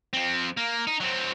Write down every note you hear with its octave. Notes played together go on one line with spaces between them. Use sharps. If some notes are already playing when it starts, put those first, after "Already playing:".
F2 C4
A#3
D#4
F#3 C4